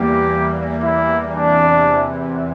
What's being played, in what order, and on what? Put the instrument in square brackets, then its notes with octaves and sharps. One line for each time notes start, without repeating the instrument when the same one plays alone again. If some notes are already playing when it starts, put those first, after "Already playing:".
Already playing: [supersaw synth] E2 E3 G3 A#3 [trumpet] G4
[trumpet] E4
[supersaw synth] E2 C3 E3 [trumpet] D4